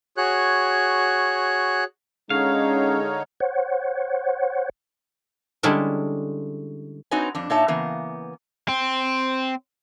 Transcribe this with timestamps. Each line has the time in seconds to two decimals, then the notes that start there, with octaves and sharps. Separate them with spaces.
0.17 F#4 G#4 C#5 F#6
2.30 D3 G#3 C#4 D#4 C#5 F5
3.40 C5 C#5 F#5
5.63 D3 G3 G#3 C#4 E4 A4
7.11 C4 D#4 F#4 B4 C#5 G#5
7.35 F2 D4
7.50 A#2 D#4 C#5 E5 A5
7.68 C#3 E3 A#3 B3
8.69 C4